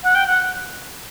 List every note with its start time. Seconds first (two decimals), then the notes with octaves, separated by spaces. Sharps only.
0.03 F#5
0.15 G5
0.27 F#5